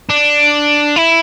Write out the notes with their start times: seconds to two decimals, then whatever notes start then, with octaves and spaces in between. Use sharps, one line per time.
0.09 D4
0.96 E4